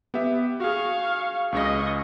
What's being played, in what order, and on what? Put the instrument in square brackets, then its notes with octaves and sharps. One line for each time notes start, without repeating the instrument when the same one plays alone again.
[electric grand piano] B3 G4 E5
[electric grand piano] F#4 G#4 [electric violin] F5 C#6
[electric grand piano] C#2 C#3 A#6 [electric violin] D#5 C#6